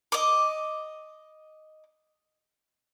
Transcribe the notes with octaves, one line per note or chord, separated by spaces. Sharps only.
D#5 D6